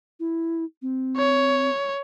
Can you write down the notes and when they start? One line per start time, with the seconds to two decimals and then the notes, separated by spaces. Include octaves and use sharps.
0.20 E4
0.82 C4
1.17 C#5